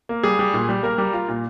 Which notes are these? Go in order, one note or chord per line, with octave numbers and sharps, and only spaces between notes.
A#3
G3 G#4
G3
A#2
G3
A#3 A#4
G3
F4
A#2